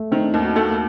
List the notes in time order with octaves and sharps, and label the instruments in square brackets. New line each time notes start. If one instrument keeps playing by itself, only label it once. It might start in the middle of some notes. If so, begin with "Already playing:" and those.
Already playing: [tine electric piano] A3
[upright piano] D#3 [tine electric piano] C4
[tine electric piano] D4
[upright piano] D#2 [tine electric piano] D#4
[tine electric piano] F#4
[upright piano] A3 [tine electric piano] F#4
[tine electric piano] A#3